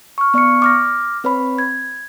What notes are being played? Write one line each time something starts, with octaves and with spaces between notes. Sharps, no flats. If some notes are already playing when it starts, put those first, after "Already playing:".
C#6 F6
B3 D5 C#6 F6 C#7
D6 F6 A#6
C4 B4 C#5 B5
G#6